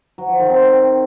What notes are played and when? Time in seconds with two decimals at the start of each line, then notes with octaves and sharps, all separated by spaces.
0.18 F#3
0.29 F3
0.39 D#3
0.50 C4